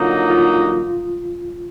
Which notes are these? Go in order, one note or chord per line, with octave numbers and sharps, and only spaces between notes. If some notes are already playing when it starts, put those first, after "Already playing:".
Already playing: D3 F#3 A#3 D#4 F4
F4